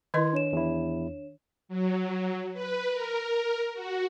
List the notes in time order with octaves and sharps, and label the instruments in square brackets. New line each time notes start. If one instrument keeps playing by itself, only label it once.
[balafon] D#3 B4 D#5 [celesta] E4 C6 G#6
[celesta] D4 C#5 E7
[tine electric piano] E2 E4
[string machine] F#3
B4
A#4
F#4